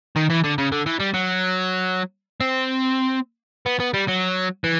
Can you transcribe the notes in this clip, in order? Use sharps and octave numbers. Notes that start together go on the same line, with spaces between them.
D#3
E3
D3
C#3
D3
E3
G3
F#3
C4
B3
B3
G3
F#3
E3